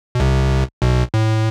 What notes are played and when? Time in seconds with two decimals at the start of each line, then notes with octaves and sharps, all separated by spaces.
0.15 B2
0.20 C2 C3
0.82 B1 B2
1.14 A2